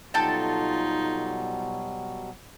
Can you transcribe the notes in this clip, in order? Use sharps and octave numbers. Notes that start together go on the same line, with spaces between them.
B2 F#3 G3 D#4 F4 A4 G5 A5